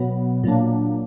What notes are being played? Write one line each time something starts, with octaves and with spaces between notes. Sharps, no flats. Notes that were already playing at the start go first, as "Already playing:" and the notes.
Already playing: B2 F#3 B3
A#2 F#3 A#3 D4